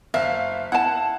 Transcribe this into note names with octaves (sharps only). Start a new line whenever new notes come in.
F#1 E5 F5
E4 F#5 A5